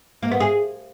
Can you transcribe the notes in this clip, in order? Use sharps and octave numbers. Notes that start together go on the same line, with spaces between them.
A#3
B3
G#4